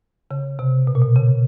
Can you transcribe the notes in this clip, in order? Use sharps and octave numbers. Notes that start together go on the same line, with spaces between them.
C#3
C3
B2
A#2
B2
C#3